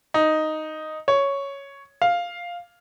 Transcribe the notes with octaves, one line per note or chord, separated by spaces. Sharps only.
D#4
C#5
F5